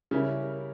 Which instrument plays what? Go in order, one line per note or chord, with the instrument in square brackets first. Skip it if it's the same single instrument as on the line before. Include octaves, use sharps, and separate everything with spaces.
[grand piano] C#3 [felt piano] G3 C#4 E4 A#4